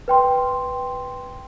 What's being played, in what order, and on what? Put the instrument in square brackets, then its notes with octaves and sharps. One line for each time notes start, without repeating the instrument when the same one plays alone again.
[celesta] B4 G5 C6